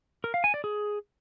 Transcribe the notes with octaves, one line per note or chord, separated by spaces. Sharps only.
A#4
F5
G#5
D5
G#4